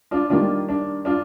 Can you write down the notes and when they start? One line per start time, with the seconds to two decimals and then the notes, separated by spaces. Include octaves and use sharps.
0.11 D4 F4
0.30 D#3 G3 A#3 D4 F4
0.69 D4
1.05 D4 F4